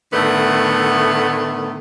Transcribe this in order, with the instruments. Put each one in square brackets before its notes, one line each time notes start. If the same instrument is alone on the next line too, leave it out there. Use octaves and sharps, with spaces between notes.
[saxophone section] A2 D3 D#3 A3 B3